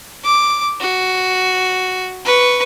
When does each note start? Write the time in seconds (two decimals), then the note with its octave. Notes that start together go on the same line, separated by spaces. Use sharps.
0.24 D6
0.81 F#4
2.25 B4 C#6